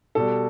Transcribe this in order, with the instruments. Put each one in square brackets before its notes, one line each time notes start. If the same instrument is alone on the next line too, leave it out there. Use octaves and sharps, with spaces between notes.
[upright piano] B2 G3 A4